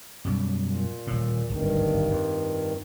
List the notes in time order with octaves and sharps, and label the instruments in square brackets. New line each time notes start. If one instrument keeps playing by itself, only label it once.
[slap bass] F#2 B2 G3
[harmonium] A#2
[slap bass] D#1 A2
[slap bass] D1 G#1 [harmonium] G2 D#3
[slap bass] F2